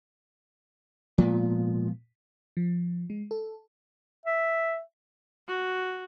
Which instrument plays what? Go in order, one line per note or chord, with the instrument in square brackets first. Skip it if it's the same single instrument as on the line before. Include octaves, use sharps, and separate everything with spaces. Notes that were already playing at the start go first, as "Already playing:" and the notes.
[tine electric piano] A#2 [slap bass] F3 G#3 B3
[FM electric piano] F3
G#3
A4
[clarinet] E5
[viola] F#4